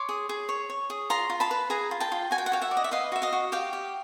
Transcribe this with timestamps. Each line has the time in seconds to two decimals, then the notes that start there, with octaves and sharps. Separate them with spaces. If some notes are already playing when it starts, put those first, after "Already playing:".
Already playing: C#5 C6 D6
0.09 G#4
0.29 G#4
0.49 C#5
0.70 C#5
0.90 G#4
1.10 F4 A#5 C6
1.30 F4
1.40 A5 B5
1.51 B4
1.70 G#4 G#5 A#5
1.91 F4
2.00 G5 A5
2.12 F4
2.31 F#4 G#5
2.38 G5
2.46 F#5
2.52 F#4 F5 G5
2.62 E5 F#5
2.71 D5
2.77 D#5
2.84 E5
2.91 B4 D#5 F5
3.12 F#4 E5
3.22 D#5 F5
3.32 F#4
3.52 G4 F5 G5
3.73 G4